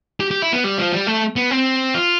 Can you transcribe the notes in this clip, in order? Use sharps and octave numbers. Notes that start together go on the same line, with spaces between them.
G4
G4
E4
B3
G3
F3
G3
A3
B3
C4
F4